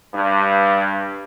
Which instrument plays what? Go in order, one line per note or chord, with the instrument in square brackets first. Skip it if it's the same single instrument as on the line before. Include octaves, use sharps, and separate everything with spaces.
[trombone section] G2